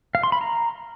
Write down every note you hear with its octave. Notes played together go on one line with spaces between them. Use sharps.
F5
C6
B5
A#5